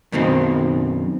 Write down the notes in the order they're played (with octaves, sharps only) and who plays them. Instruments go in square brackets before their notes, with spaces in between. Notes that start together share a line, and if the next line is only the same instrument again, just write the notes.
[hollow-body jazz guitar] F#2 B2 D#3 C4